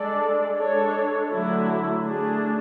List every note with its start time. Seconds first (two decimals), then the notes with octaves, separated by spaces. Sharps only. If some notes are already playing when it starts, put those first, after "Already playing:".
Already playing: G#3 D4 A4 D5
0.58 G#3 D4 A4 C#5
1.31 D3 F#3 A3 E4
2.05 A3 D4 G#4